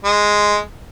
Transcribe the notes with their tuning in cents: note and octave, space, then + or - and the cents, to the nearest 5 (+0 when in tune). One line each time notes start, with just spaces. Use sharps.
G#3 +0